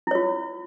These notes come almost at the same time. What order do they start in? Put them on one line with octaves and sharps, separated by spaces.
E4 C#5 F4